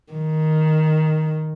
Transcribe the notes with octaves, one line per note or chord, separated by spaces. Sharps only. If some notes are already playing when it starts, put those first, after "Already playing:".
D#3